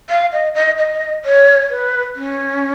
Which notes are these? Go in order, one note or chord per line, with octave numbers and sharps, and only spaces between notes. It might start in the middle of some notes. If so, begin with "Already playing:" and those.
F5
D#5
D#5
D#5
C#5
B4
C#4